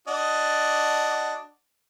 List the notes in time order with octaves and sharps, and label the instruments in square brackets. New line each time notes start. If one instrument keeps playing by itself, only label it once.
[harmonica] D4 F#4 D#5